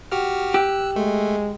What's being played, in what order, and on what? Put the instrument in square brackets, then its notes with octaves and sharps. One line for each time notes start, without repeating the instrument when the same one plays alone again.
[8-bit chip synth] F#4 G4 F6
[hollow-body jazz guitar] G4 [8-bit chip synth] E6 F#6
[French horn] G#3 [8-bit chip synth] A3